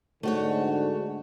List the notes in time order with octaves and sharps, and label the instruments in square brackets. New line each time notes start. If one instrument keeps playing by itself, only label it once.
[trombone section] G#2 D3 [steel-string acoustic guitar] A3 F#4 C#5